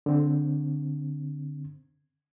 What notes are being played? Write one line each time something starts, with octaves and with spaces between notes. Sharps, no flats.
D3 C4